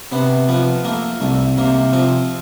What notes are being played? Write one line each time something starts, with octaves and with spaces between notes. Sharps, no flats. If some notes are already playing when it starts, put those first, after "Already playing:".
C3 B3
F3 B3
A3 A#3
C2 A3
C3 A#3
F3 C4